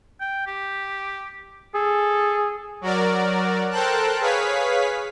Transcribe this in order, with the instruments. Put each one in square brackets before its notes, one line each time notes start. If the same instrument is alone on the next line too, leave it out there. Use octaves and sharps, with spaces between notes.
[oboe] G5
G4
[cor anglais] G#4 [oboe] A4
[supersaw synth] F#3 F#4 A#4 D5
A4 A#4 C5 G5 A5 F#6
G#4 B4 C#5 F5 B6